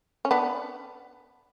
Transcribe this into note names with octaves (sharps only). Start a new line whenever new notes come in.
C#4
B3 D4